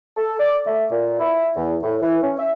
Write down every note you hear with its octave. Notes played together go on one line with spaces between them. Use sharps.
A4
D5
A3
A#2
E4
E2
A2
E3
C#4
E5